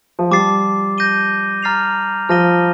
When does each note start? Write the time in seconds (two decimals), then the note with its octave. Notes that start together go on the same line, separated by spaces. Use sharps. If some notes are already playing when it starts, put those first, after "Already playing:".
0.19 F3
0.31 G3 A5 D6 A6 C7
0.98 G6 A#6 D#7 G7
1.63 A#5 F6 A6 C7 F7
2.29 F3 F6 A#6 D#7 G7